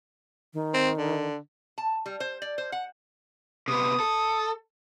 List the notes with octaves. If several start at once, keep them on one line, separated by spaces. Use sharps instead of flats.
D#3
C4
D3
A5
G3
C5
D5
C5
F#5
C3 B3 D#6
A4